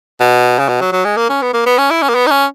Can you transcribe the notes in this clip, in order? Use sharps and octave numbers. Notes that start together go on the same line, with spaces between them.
B2
C#3
B2
F#3
F#3
G#3
A#3
C#4
B3
A#3
B3
C#4
E4
C#4
A#3
B3
D#4
C#4